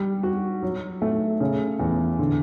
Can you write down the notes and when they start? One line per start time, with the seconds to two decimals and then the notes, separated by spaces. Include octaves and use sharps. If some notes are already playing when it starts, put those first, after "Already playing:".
Already playing: G3
0.23 F#4
0.63 F#3
1.02 A3
1.40 C#3
1.79 E2
2.19 D3